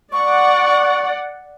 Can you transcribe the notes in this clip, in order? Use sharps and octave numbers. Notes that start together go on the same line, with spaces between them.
D5 F#5 C#6